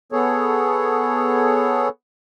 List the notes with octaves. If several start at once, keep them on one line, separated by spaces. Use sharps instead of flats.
B3 G#4 A4 C#5